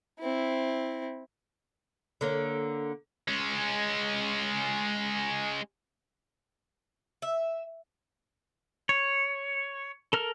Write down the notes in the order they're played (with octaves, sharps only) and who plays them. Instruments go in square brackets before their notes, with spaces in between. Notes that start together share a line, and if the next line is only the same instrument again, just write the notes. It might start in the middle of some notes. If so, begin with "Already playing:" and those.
[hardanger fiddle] C4 E4
[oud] D3 A#3 C#5
[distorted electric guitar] G#3 C#4
[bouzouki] E5
[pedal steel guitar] C#5
A4 A#4 F6